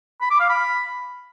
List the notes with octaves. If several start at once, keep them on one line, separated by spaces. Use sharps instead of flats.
B5
D6
F5
B5